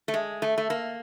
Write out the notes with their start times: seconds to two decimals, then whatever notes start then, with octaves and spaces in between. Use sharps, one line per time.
0.08 A3
0.14 G#3
0.42 A3
0.58 A3
0.70 A#3